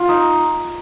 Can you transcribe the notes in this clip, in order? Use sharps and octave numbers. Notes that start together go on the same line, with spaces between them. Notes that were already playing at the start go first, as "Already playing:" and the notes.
Already playing: F4
D#4